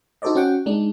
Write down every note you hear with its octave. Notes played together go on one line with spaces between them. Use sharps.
D#4 F#4 A4 C5 D5 D#5
C#4 F#4 F#5 G5
G#3 D4 D#4